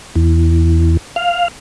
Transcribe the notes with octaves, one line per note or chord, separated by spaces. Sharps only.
E2
F5